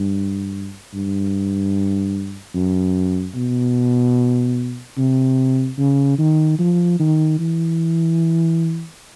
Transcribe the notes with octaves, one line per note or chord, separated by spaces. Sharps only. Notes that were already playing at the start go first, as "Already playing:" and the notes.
Already playing: G2
G2
F#2
B2
C3
C#3
D#3
F3
D#3
E3